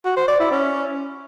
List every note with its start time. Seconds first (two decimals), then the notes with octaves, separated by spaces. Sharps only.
0.05 F#4
0.16 C5
0.28 D5
0.40 E4
0.52 C#4